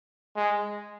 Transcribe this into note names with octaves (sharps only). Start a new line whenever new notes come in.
G#3